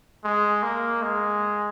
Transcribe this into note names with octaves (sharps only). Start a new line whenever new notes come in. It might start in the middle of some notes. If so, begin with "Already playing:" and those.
G#3
A#3
G#3